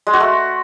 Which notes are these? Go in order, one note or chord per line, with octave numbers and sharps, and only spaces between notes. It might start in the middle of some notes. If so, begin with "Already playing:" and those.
G#3
F#4
A3